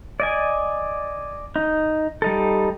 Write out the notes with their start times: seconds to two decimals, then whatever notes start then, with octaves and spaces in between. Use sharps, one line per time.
0.20 D5 D#5 G#5
1.56 D#4
2.22 G3 D#4 A4